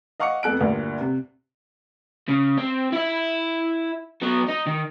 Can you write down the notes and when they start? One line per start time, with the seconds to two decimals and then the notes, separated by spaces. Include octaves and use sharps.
0.20 D#5 F5 F#5 C#6 D6 C#7
0.43 F2 B3 A4 F#6 D7
0.61 D2 G2 A#2
1.01 C3
2.28 C#3
2.57 C4
2.92 E4 E5
4.23 F#3 B3
4.49 D#4
4.67 D#3